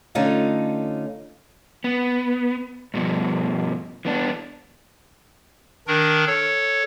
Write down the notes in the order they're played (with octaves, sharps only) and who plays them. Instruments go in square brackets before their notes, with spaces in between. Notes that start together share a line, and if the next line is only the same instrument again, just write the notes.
[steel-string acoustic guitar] D3 A3 C#4 D#4 F4
[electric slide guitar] B3
G2 B2 F3
E3 B3 D4
[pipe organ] D#3 D4 A#4
A4 C#5